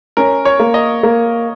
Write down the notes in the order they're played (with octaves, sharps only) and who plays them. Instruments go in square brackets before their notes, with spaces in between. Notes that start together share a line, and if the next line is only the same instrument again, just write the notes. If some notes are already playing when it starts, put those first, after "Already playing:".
[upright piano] C#4 [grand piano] A#4
[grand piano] C#5
[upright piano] A#3
[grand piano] D#5
[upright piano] A#3